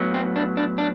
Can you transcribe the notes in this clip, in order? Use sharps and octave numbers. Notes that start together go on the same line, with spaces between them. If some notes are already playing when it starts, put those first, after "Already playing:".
Already playing: A2 F#3 B3
C4
D4
D4
D4